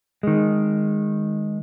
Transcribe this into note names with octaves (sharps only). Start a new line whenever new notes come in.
D#3 G#3